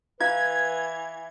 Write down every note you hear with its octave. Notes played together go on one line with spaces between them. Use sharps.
E3 E4 B4 F5 G#6